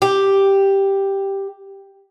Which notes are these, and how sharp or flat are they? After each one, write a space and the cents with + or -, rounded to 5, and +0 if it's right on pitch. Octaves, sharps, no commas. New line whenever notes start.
G4 +0